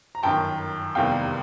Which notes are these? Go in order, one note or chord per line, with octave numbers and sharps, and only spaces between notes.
A#5
G1 F#2 D#3 G5 A5
F1 E2 C3 D#3 G3 F5 G5